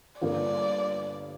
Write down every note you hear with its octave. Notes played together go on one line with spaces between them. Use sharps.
G1 G2 D3 A#3 D5